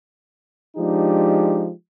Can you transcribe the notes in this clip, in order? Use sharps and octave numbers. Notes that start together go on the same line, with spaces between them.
F3 G#3 D4 D#4 G4